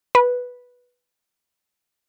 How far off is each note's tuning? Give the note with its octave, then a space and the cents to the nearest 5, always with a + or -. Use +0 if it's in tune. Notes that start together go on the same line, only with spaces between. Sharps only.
B4 -5